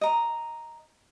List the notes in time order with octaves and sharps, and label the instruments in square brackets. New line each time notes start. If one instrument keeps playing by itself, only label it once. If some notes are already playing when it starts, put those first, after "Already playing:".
[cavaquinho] D#5 A#5